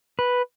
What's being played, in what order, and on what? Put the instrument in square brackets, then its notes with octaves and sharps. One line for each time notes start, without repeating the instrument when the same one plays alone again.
[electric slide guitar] B4